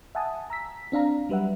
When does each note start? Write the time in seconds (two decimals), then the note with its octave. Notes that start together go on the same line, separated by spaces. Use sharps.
0.15 E5 F#5 G#5 A5 D#6
0.50 A#5 E6 B6
0.92 C4 D4 F5 A#5
1.29 F#3 G3 B4 E5 F#5